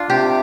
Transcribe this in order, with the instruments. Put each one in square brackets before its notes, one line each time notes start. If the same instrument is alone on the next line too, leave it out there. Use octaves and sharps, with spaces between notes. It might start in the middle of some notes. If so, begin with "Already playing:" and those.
Already playing: [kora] D4 F4
[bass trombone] C3 [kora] G4